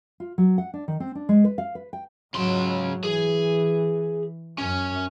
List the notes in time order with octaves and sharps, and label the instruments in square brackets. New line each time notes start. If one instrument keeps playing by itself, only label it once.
[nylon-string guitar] F4
F#3
F#5
D4
D#3
C4
D4
G#3
B4
F5
B4
G5
[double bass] G#2 F#3 [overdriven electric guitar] C#3 C6
[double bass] E3 [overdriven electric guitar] G#4
[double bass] F#2 [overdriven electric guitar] C#4